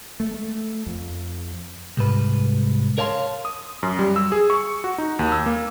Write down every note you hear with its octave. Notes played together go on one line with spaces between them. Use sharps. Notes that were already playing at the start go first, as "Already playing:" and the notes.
A3
A3
F2
C2 G#2 B4
A#4 C#5 F5 A5 A#5 C6
D#6
F#2
G3
E6
G#4
C#6
F#4
D#4
D#2
E6
A#3